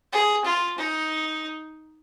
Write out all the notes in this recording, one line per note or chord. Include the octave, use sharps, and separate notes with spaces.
G#4
F4
D#4